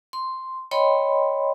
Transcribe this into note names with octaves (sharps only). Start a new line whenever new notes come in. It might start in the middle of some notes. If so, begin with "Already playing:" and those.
C6
C#5 D#5 G5 B5 C6